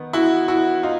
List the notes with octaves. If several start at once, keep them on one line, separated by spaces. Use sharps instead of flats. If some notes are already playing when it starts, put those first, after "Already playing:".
Already playing: D#3 B3
E4 F#4
E4 F#4
D#4 F4